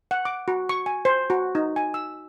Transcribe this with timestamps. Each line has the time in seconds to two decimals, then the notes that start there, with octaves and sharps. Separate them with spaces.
0.11 F#5
0.25 D6
0.48 F#4
0.69 C#6
0.86 G#5
1.05 C5
1.30 F#4
1.55 D#4
1.76 G#5
1.94 E6